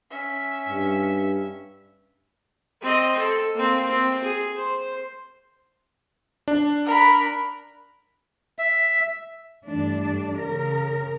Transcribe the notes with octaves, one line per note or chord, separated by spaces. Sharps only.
C#4 E5
G2
C4 D#5
A4
A#3 C4
C4
G#4
C5
D4
A#4 B5
E5
G2 E3 A3 D4
C#3 A#4